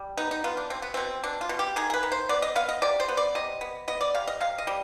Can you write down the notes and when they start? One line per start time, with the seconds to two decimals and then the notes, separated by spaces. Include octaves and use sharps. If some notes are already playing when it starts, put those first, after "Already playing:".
Already playing: G3
0.17 B3 D#4
0.31 D#4
0.44 B3 F4
0.57 D4
0.70 B2 C4
0.82 B3
0.94 B2 C4
1.23 B2 D4
1.41 F4
1.49 B2
1.59 G4
1.76 D#3 G#4
1.90 G#4
1.94 B4
2.03 D#3
2.12 C5
2.29 B3 D5
2.42 D#5
2.56 B3 F5
2.69 D#5
2.82 C3 D5
3.00 C5
3.08 B3
3.17 D5
3.35 C3 D#5
3.61 B3
3.88 B3 D#5
4.01 D5
4.14 C3 F5
4.27 D#5
4.40 C3 F5
4.58 D#5
4.67 G3